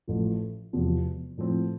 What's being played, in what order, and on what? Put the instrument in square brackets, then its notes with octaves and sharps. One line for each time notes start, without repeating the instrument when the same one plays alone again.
[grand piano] A1 A2 F3 A3
E1 E2 C3 F3
A2 F3 C4